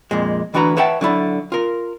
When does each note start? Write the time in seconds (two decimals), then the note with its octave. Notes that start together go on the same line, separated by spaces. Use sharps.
0.11 F2 A#2 G#3
0.54 D2 E3 D4 F#4 B4 A#5
0.77 B4 C#5 E5 F#5 G5 A5
1.01 D3 F#3 E4 D5
1.52 F4 A#4